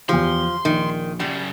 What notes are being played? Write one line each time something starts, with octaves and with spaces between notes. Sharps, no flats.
E2 F3 G4 C6
A#1 D#3
F#2 C#3 G3